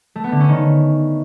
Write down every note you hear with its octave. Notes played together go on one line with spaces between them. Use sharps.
A3
B3
D3
C#4
D#3